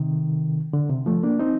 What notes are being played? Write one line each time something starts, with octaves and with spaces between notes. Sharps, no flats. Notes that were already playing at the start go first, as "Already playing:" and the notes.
Already playing: C3 D#3
D3
C3
F3 A3
A#3 D4
C4 D#4